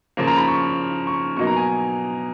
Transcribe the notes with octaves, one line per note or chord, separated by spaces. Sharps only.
C#3 F3 A#3
A#5
B5
C#6
C#6
B2 F#3 A#3 D#4 C#6
A#5
G#5